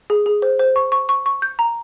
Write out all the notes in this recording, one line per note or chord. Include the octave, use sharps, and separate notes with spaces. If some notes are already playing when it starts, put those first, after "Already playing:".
G#4
G#4
C5
C5
C#6
C#6
C#6
C#6
G6
A#5